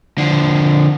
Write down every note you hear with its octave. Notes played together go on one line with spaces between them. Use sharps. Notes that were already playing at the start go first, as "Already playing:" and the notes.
D3 F3